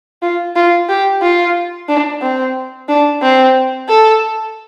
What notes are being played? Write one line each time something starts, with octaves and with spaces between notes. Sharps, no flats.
F4
F4
G4
F4
D4
C4
D4
C4
A4